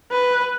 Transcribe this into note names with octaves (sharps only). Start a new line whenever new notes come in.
B4